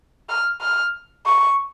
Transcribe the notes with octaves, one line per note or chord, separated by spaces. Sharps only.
F6
F6
C#6